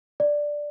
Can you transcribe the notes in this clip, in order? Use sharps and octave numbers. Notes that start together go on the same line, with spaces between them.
D5